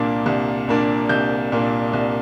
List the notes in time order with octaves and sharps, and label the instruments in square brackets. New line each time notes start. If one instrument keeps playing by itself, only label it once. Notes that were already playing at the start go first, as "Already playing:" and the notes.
Already playing: [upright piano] C2 A#2 A#3 D4
C2
A#2 A#3 D4
C2 G6
A#2 A#3 D4
C2